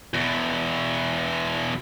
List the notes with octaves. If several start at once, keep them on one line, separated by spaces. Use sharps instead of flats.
E2 B2